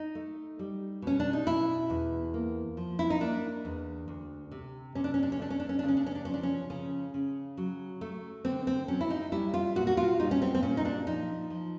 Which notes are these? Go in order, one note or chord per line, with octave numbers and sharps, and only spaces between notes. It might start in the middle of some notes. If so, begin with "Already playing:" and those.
Already playing: D#4
A3
G3
B2 C#4
D4
D#4
B2 E4
E2
A#3
F3
E4
D#4
A#3 D4
E2
D2
C3
C3 C#4
D4
C#4
D4
C#4
A3 D4
C#4
D4
C#4
C#3 D4
C#4
D4
C#4
D4
F3 C#4
D4
C#4
C#3 C#4
C#3
F#3
A3
D3 C4
C4
F#3 C#4
E4
D#4
G3 E4
F4
A#2 F#4
F#4
F4
G3 D#4
C#4
C4
C4
A#2 C#4
D#4
D4
F3 D#4
F3